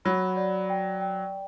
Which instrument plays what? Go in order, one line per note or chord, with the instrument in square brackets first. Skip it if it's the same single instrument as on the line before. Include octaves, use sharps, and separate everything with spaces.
[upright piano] F#3 [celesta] B5
[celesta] D5
G5
G5